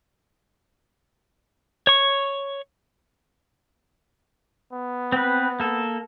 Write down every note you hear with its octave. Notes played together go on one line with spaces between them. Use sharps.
C#5 C#6
B3
C4 B4
A#3 A4